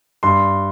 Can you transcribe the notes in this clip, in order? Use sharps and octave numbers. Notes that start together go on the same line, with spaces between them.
G2 C6